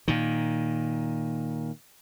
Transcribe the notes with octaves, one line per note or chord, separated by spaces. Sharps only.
A#2 D#3